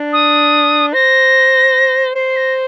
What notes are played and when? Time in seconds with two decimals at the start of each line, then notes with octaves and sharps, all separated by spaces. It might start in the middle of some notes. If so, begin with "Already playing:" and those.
Already playing: D4
0.13 D#6
0.94 C5 A#6
2.16 C5 C7
2.36 A#6